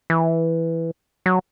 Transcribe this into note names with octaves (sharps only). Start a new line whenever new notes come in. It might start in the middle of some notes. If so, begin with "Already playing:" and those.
E3
F#3